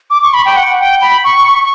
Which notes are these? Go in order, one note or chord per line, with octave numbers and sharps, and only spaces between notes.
D6
C#6
B5
G5
F#5
G5
B5
C#6
C#6